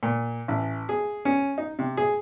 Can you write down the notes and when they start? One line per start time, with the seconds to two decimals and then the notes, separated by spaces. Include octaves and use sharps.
0.03 A#2
0.48 A1
0.89 G#4
1.25 C#4
1.58 D#4
1.79 C3
1.97 G#4